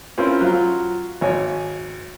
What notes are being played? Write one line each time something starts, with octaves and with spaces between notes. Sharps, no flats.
C4 C#4 E4 F4 A#4 C5
F#3 F4
G#1 C#5 G#5